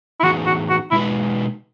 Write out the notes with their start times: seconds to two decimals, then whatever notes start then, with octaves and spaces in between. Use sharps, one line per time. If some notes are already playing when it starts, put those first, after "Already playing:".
0.20 E4
0.23 A2 E3 B3 D#4 F#4 G#4
0.46 F#4
0.69 F#4
0.91 B2 G#3 D#4 E4 F#4 B4